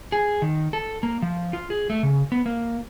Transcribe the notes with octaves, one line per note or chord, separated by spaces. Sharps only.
G#4
D#3
A4
A#3
F3
F4
G#4
A3
C#3
B3
A#3